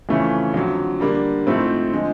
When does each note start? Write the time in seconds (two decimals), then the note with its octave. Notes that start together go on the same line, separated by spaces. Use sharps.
0.09 F2 C#3 E3 A3 C#4
0.54 F2 D3 F#3
1.00 D3 G3 A#3 D4
1.46 G#2 F3 A3 C4 E4
1.93 D3 F3 G#3